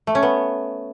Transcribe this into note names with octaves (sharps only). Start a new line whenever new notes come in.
A3
C#4
B3